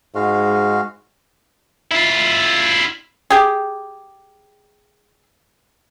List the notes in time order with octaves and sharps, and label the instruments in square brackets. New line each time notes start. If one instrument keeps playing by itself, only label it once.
[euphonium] G#2 [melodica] G#3 F#4 F5
[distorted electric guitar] E4 F4
[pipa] G4 G#4